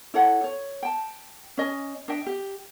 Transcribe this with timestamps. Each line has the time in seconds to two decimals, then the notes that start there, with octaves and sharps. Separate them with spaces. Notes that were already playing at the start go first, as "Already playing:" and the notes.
0.14 E4 A4 C#5 F#5
0.44 C#5
0.83 G5 A5
1.57 C#4 D#5 G#5
2.08 D4 D#5 E5 G5
2.26 G4